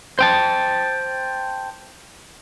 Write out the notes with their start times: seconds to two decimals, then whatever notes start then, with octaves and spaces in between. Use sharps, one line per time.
0.19 C5 G5 A5